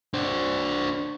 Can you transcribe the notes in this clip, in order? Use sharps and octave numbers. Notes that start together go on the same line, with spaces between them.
D4 C5